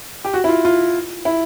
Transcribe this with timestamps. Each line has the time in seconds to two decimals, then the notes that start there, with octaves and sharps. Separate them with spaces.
0.25 G4
0.34 F#4
0.44 E4
0.49 F4
0.65 F4
1.25 E4